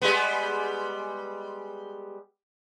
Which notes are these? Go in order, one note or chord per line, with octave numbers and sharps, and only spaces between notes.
G3 G#3 B3